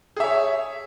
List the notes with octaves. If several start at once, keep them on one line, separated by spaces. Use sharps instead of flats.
G#4 C#5 E5